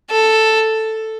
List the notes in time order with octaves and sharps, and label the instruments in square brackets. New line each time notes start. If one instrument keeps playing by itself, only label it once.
[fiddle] A4